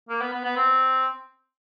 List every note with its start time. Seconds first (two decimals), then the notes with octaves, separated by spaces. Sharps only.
0.09 A#3
0.21 B3
0.33 B3
0.45 B3
0.57 C4